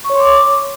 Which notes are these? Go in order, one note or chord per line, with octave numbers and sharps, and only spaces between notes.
C#6
C#5
C6
D6